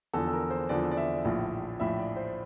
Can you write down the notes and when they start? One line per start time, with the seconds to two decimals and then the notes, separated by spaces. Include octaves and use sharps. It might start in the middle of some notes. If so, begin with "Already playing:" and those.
0.14 E2 D3 F3 A4
0.28 A4
0.33 A#4
0.50 C5
0.69 E2 D3 F3 D5
0.91 D5
0.97 E5
1.24 A#1 A2 F3
1.79 A#1 A2 F3 E5
1.99 D5
2.16 C5